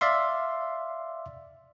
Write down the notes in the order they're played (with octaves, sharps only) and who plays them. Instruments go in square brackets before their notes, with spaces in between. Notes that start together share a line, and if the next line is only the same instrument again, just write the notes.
[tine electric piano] D5 E5 F5 C6